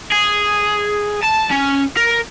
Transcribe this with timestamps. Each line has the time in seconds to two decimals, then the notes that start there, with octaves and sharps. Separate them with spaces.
0.12 G#4
1.24 A5
1.52 C#4
1.97 A#4